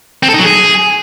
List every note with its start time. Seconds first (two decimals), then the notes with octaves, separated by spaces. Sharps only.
0.23 C4
0.28 A4
0.34 D#4
0.39 F#3
0.44 G#4